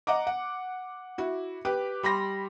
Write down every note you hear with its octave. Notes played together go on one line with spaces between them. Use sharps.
D#5 F#5 A#5 D6
F#5
E4 F#4
G4 B4 D6
G3 B5 C6 A#6